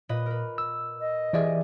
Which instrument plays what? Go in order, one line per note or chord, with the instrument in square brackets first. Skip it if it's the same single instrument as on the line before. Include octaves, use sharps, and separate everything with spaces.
[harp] A#2 B4 D#5
A#4 B4
[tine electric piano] E6
[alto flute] D#5
[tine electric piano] E3 D5 E5 [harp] G4 G#4